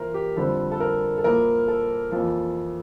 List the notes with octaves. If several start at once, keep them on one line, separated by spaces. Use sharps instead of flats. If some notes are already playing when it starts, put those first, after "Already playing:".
Already playing: E3 A#3 F4 A#4 C5 E5
G4
F2 D3 G3 C4 E4 A4
A4
A#4
A4
A#2 F3 A#3 E4 A#4
A4
F2 E3 A#3 F4 A4